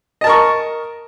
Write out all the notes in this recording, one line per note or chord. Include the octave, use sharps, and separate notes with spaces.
A#4 D#5 A5 C#6